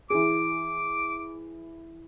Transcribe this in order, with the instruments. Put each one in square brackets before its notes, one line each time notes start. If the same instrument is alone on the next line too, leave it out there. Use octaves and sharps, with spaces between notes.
[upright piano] E3 G#4 [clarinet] D6